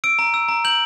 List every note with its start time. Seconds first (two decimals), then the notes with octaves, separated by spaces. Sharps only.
0.04 E6 D7
0.19 A#5
0.34 E6
0.49 A#5
0.65 G6 F#7